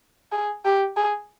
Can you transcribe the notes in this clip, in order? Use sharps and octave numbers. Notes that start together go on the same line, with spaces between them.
G#4
G4
G#4